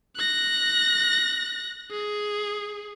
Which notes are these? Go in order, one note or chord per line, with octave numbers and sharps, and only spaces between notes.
F#6 A#6
G#4